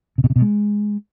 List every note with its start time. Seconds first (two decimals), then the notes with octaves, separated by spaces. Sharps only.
0.18 C3
0.24 B2
0.30 C3
0.36 B2
0.42 G#3